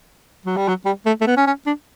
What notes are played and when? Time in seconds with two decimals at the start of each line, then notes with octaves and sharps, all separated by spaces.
0.46 F#3
0.57 G3
0.68 F#3
0.85 G3
1.06 A3
1.21 A3
1.27 B3
1.37 C#4
1.47 C#4
1.66 D4